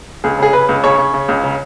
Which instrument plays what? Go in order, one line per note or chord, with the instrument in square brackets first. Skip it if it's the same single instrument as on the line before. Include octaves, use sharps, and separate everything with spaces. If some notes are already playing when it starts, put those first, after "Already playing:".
[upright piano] C#2 G#4
C#3 G#4
C#3 B4
C#2
C#3 C#5
C#3
C#3
C#2
C#3